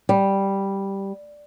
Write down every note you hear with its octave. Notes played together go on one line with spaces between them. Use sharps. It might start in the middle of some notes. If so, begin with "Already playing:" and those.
G3